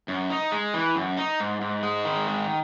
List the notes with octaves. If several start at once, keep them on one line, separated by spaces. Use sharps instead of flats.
F#2
D#4
G#3
E3
F#2
D#4
G#2
G#2
G#3
D#3
G#2